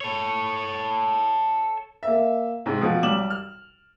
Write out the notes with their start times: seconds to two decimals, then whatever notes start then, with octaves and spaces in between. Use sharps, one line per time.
0.01 A4 C#5
2.03 A#3 E5
2.66 G#2 C3
2.81 B2 F3 G4
3.03 B1 G3 D6 E7 F#7
3.30 F6